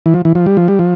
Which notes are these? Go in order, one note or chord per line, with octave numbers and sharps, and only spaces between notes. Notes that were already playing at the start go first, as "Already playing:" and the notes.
E3
F3
E3
F3
G3
F3
G3
F3